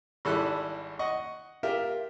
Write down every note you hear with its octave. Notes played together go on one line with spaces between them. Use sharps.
G#1 G3 E4 A4 F#6
D#5 F#5 C#6
F4 G4 A#4 E5